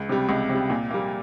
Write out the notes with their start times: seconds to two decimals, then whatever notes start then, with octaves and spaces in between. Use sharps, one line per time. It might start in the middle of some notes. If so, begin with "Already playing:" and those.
Already playing: C#2
0.09 C3 G3
0.29 C#2
0.49 C3
0.55 G3
0.70 A#2
0.90 G3 A#3